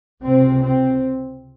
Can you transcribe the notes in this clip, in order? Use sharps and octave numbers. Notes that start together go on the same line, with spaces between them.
C#2 C3 C4
C4